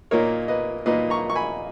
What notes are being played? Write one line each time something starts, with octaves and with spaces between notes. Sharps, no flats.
A#2 A#3 D#4 A#4 C#5
B4 D#5
A#2 A#3 D#4 B4 D#5
A#5 C#6
C#6
G#5 B5